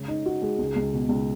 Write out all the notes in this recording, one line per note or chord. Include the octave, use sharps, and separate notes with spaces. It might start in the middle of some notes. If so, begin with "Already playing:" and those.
Already playing: C#3 G#3
D#4
F#4
G#3
C#2
C#2
B2
C#2